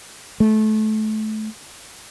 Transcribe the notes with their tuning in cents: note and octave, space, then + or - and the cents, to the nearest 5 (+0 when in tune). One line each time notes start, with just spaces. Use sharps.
A3 -25